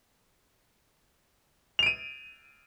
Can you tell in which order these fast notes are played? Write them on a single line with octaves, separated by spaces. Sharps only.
F7 D7 D#7